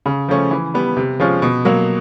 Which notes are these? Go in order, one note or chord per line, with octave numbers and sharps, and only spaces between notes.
C#3
F3 A3 C#4
E3
G3 B3
C3
F3 G#3 C#4 F4
B2
F#3 A#3